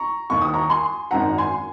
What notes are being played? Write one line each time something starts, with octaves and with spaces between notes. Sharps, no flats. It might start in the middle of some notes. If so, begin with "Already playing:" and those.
Already playing: A#5 C#6
D#2 D#3 A#3 C#6
D#6
A#5 C#6
G#5 C6
G#1 F#2 D#3 F#5 A#5
G#5 C6